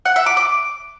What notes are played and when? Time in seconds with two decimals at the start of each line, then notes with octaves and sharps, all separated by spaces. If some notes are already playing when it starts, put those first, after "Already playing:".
0.05 F#5
0.16 E5
0.26 D6
0.37 D6